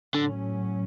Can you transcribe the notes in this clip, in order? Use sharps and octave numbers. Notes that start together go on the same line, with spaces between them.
A2 D3 F#3 C#4